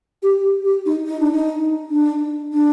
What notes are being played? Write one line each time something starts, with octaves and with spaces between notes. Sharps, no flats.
G4
G4
G4
D#4
D#4
D4
D#4
D4
D4